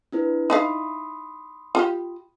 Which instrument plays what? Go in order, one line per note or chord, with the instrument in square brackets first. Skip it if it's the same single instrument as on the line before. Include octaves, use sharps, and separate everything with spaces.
[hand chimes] D4 E4 B4
[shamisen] D#4 E4 F5 [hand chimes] B5 C6 D#6
[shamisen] F4 G4